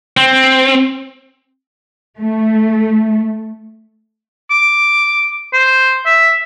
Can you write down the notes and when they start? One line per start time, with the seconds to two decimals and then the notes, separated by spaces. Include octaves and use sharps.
0.17 C4
2.20 A3
4.51 D6
5.53 C5
6.06 E5